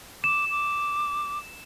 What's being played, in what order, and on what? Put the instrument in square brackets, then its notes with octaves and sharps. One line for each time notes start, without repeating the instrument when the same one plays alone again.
[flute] D6 [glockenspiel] E7
[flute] D6